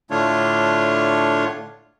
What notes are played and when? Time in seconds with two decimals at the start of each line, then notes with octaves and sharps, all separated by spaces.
0.11 A2 D3 A3 D4 F4 C#5